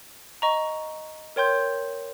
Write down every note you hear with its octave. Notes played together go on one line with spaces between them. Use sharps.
D#5 A#5 C#6
A#4 C#5 G5 C6 G6